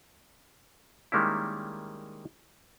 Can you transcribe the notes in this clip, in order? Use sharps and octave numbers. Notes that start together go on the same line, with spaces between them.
D#3 G3 G#3 A#3 C#4 E4